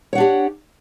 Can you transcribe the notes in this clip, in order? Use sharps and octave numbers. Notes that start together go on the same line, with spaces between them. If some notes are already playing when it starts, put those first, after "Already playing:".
D4 G4 C#5 F#5